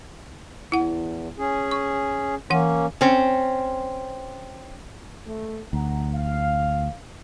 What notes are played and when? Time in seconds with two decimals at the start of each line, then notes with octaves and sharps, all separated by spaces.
0.72 E2 E4 F#5
1.38 C#4 G#4
1.71 C#6
2.50 E3 A#3 C#4 F#5
3.01 C4 C#4
5.26 A3
5.73 D2 F#5 A#5
6.14 F5